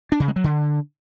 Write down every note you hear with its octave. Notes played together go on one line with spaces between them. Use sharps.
D4
C#3
G#3
F#3
D3